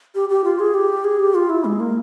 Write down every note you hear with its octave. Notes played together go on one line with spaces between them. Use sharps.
G4
G4
F4
G#4
G4
G#4
G4
F4
E4
G#3
A#3